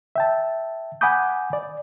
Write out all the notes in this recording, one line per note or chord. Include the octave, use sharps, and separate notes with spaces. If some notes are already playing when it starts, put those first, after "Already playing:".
E5 G5 A5
F#5 G#5 B5 D6 D#6 G6
D5